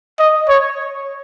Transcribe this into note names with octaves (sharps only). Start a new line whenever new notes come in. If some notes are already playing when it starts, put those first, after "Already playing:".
D#5
C#5